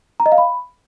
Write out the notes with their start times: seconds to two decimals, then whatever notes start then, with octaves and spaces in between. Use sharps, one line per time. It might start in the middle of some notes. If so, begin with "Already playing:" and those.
0.20 A#5
0.26 D#5
0.32 F5
0.38 B5